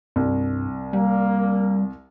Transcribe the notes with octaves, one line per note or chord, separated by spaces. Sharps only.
C2 G2
G3 A#3